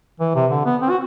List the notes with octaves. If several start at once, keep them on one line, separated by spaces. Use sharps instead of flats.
E3
C3
D3
B3
C4
F#4